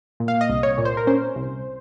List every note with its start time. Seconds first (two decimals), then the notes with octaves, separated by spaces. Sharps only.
0.20 A#2
0.28 F5
0.41 D#5
0.49 C2
0.63 C#5
0.78 A#2
0.85 C5
0.97 A#4
1.07 C#4 C5
1.36 C2